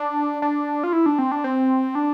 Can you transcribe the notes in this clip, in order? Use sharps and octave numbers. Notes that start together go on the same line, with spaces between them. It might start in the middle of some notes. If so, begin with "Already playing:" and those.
Already playing: D4
D4
F4
E4
D4
C4
D4
C4
D4